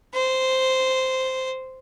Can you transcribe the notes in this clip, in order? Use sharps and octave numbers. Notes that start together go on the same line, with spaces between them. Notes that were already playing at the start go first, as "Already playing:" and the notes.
C5